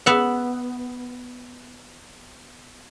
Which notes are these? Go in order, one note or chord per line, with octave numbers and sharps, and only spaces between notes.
B3 E5 F#5